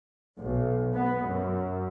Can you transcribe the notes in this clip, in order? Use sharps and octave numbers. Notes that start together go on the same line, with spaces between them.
B1
B3
F#2